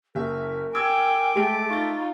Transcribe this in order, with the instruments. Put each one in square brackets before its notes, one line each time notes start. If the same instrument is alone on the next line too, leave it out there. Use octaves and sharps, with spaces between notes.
[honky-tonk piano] F#1 E5 [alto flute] A#4
[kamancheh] G5 G#5 [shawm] D6 [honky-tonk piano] E6 G#6
[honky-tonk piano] G#3 D7 [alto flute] A3
[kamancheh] D#4 F4 [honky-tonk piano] C#6 A6